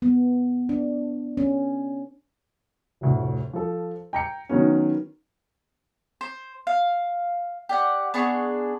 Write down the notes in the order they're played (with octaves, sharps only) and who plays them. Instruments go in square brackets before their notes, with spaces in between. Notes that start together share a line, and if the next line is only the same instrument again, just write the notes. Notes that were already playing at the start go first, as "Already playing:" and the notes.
[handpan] B3
D4
C#4
[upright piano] F1 D2 A2
F3 A4
G5 A#5 C#7
D#3 F#3 B3 C#4
[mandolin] C5
F5
G4 D5 F#5
B3 D4 G#4 C#6